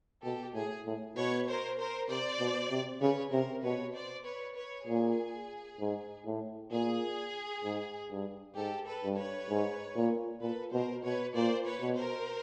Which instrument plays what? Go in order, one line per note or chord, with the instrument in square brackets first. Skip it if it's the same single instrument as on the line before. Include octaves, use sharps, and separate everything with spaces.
[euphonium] B2 [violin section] G4 A4
[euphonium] A2 [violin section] G#4
[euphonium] A2
[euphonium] B2 [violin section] B4 C#5
[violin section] A#4 C5
A#4 C5
[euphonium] C3 [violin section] C5 D5
[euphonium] B2
C3
[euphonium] C#3 [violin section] B4 C#5
[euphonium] C3 [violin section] A#4 C5
[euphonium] B2 [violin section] B4 C#5
[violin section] C5 D5
B4 C#5
B4 C#5
[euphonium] A#2 [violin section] G#4
[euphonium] G#2
A2
[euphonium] A#2 [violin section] G#4
[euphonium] G#2
G2
[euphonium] G#2 [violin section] G4 A4
[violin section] A4 B4
[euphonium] G2
[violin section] B4 C#5
[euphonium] G#2
A#2
[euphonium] A#2 [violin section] A4 B4
[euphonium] B2 [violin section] A#4 C5
[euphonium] B2 [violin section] B4 C#5
[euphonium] A#2 [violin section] C5 D5
[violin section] B4 C#5
[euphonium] B2
[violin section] A#4 C5